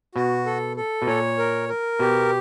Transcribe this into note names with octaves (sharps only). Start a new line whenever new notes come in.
B2 F#4
A4
A4
B2
A#2 C#5
A#4
A#4
B2 G4